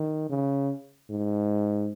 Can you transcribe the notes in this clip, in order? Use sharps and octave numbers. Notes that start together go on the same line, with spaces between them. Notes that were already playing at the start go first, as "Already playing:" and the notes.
Already playing: D#3
C#3
G#2